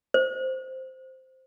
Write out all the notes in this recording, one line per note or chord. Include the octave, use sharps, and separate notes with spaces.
C5